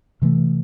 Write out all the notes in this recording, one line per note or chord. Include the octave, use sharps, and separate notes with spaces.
C3 E3 A3